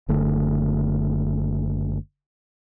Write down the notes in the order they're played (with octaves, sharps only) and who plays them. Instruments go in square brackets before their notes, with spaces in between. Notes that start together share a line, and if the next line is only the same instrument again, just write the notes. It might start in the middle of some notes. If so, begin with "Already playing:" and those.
[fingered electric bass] F#1 D3 A3